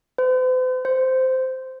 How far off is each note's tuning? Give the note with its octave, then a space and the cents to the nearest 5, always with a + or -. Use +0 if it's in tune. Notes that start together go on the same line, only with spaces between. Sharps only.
C5 -45
C5 -10